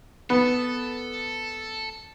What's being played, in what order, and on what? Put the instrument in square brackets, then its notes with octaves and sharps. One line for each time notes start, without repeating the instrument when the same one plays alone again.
[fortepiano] B3 [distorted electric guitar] A4